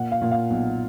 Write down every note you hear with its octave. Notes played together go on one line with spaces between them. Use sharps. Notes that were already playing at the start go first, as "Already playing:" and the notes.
Already playing: A#2 F#5
F5
A#2
F5
B1